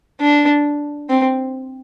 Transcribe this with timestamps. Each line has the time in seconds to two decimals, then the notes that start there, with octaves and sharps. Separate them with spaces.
0.20 D4
1.10 C4